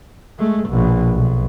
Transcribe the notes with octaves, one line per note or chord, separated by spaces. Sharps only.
G#3 A3
A#1 B2
B1